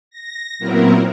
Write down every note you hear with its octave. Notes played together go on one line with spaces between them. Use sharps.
A#6
A#2 F#3 B3 C4 E4 A#4